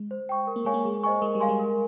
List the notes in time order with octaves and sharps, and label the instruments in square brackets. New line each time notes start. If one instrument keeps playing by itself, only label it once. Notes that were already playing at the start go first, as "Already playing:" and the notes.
Already playing: [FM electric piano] G#3
[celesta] C5
G5 C#6
A#4
[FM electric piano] A#3
[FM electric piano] G#3 [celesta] C#5 F5 G#5 C#6
[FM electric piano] A#3
[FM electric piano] G#3 [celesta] G#4
[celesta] C5 D#5 G#5 C#6
[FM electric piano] G#3 [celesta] A#4
[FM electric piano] G3
[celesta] F5 G#5 C6
[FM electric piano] G#3
[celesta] A#4